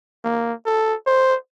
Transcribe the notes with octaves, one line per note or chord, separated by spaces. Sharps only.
A#3
A4
C5